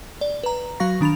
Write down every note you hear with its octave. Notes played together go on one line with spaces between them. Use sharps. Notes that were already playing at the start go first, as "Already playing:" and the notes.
D5
B4 A#5
F#3 F#4 F5 C#6 A#6
D#3 D4 B5 A6 F7